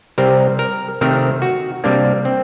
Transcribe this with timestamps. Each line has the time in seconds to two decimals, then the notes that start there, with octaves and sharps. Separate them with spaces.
0.18 C3 G3 C4 A#4
0.59 A#4
1.01 C3 D#3 A3 C4 A#4
1.42 F#4
1.84 C3 G3 A#3 D4
2.25 C4